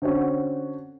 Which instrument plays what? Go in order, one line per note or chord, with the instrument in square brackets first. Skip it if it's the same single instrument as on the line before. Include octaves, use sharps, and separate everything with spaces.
[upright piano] D3 C4 C#4 F#4